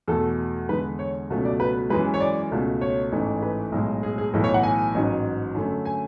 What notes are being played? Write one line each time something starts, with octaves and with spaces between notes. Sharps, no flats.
E2 B2 A3 A4
E2 D3 G#3 B4
C#5
C#2 B2 F#3 A3
D5
B4
F#2 E3 G#3 B4
C#5
D5
C#2 B2 A3
C#5
A1 G#2 E3 A3
B4
B1 A2 G#3
G#4
G#4
B1 A2 E3 A4
C#5
F#5
G#5
A1 G#2 F#3
F#2 D3 A3
G#5